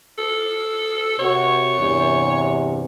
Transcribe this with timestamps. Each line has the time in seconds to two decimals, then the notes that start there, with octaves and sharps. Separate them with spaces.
0.18 A4
1.19 C3 F#4 C#5
1.78 E2 G2 C3